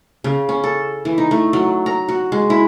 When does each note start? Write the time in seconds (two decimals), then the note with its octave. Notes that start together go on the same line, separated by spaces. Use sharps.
0.24 C#3
0.49 C#4
0.64 A4
1.05 E3
1.18 D#4
1.31 A3
1.53 F#3
1.86 A#5
2.09 F#4
2.32 G#3
2.50 E4